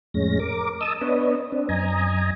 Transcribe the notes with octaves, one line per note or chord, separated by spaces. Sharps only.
F2 A2 G#3 C#4 A#6
A#4 D6
D#5 A5 D#6 E6
B3 D4 B4 C#5 D#5
C4 D4
F#2 D#5 G#5 A#5